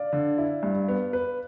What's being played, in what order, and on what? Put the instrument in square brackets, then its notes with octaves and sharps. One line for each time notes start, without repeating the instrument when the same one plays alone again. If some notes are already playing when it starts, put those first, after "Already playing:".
Already playing: [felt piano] D5 F5
[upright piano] D3
E4
G2
B3
B4